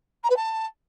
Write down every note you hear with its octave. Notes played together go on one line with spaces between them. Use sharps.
A#5
B4
A5